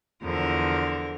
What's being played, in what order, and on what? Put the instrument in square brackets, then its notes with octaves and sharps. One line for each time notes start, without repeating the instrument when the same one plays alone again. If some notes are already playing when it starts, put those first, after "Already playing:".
[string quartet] E2 D3 F3 A#4